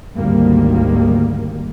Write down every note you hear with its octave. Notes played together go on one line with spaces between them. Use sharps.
G#1 D2 G#2 D#3 G3 A#3